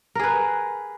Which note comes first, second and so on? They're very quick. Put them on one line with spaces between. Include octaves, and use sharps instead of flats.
A#4 G#4 B4